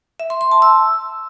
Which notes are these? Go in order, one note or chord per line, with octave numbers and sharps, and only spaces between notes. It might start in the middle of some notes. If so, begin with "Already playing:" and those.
E5
C6
C6
A5
E6